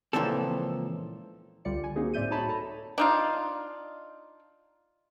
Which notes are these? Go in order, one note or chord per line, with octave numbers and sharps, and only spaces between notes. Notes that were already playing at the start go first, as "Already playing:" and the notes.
C#2 A#2 E3 F3 C4 A4
C#2 D3 G3 F4 D5 C#7
G#5
G3 A#3 C4 D#4 F#4 G#4
A2 C5 D5 E5 G6 D#7
D#4 F#4 C#5 A5 B5
A4 A5 A#5
D4 D#4 F4